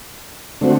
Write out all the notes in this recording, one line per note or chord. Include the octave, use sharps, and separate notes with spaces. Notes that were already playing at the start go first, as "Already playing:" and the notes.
D3 A3 C4 F#4